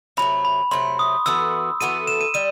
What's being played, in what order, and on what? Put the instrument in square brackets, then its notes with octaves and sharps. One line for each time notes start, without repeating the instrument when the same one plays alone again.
[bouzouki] C3 F#3 A3 [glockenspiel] B5
[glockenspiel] B5
[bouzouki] C3 F#3 A3 [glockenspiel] C6
[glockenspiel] D#6
[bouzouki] E3 B3 F#4 A4 [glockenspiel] E6
[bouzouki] E3 B3 F#4 A4 [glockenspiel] D#7
[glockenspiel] E7
D#7
[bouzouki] G3 [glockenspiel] D#7